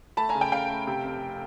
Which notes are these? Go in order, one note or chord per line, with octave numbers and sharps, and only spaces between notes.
A3 A5 B5
G#5 A#5
C#3
G5 A5
C#3 F5 G5
A3
C3
F1